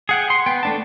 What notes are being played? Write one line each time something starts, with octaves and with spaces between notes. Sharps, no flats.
G#4 F#5 G5
C6
B3 G5
A3 D4 A5